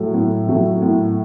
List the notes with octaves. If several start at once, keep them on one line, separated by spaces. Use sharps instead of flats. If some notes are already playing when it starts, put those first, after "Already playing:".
Already playing: A2 F#3 A3
A2
F#3 A3
A2